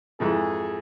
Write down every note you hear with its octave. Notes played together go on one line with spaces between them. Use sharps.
F2 G#2 E3 G#4